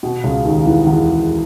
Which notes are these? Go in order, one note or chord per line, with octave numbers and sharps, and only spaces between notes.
B2
C#2 C#3
D#2 D#3
E2 E3
E2 E3